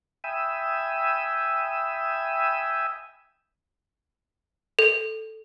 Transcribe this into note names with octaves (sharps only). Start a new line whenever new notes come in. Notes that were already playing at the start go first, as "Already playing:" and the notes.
E5 G5 G#5 B5 D#6 E6
A4